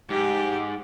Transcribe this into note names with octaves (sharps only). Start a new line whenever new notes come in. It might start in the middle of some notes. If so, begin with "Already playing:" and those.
G#2 G4